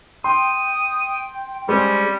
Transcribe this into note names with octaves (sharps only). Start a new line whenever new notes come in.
G5 C6 D#6
G3 G#3 C4 C#4